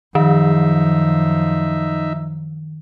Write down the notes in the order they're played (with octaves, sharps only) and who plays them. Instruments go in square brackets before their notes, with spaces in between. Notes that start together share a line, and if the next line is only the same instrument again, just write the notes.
[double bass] F#2 F3 [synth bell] D#3 [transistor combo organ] D#4 E5